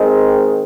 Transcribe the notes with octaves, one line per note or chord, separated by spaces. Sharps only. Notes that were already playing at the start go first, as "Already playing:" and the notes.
Already playing: D#3 G#3 C4